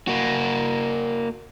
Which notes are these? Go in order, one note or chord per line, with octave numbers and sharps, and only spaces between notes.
A#3 F#4